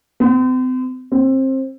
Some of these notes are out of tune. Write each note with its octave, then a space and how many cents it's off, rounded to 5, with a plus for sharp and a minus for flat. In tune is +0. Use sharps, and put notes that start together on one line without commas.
C4 -40
C4 +25